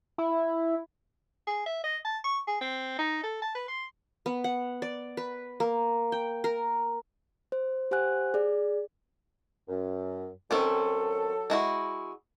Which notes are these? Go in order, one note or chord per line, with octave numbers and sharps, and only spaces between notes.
E4
G#4
E5
D#5
A5
C#6
G#4
C4
D#4
A4
A5
B4
C6
B3
F#5
D5
B4
A#3
G5
A#4
C5
G4 C5 F#5 G#5 F#6
G#4 D5
F#2
D#3 F#3 C4 C#4 A4
G#3 E4 F#4